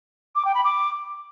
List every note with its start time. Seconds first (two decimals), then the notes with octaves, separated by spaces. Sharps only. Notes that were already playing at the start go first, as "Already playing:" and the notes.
0.35 D6
0.45 G5
0.54 B5
0.64 D6